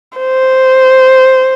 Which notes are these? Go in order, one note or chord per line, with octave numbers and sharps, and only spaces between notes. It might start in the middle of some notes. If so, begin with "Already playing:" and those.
C5